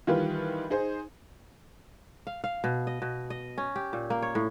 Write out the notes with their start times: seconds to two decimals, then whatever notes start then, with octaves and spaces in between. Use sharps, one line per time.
0.07 D#3 E3 G3 F4 B4
0.70 D#4 G#4 C5
2.27 F5
2.44 F5
2.64 B2
2.87 D#5
3.02 B2
3.30 D#5
3.58 C#4
3.76 G4
3.93 A#2
4.10 A#3
4.22 C#5
4.35 A2